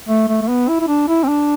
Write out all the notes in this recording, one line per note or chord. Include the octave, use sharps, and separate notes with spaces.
A3
A3
A3
B3
E4
E4
D4
E4
C4
D4